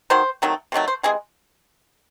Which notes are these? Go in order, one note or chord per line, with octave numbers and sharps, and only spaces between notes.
D#3 F#3 C5
C3 D#3 F#3 A3
C3 D#3 F#3 A3
C5
C3 E3 G#3 G#4